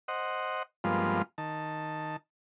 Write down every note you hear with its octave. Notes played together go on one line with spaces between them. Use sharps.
C5 D#5 F#5
G2 F3 G#3 A#3 B3 F4
D#3 A5